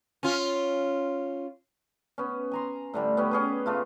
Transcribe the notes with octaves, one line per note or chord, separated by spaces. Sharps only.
C#4 F4
B3 C#4
G#5 A#5 C6
A2 D3 G3
B3 C#4 G4
C#4 G#4 B4
C#3 A3 F4